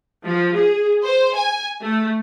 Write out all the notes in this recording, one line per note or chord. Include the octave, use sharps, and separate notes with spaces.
F3
G#4
C5
G#5
A3